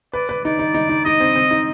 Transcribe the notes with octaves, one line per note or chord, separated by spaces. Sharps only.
B4 D5
B4
D#4 D5
D#4
D#4
D#4
D#4 D#5
C4
C4
D#4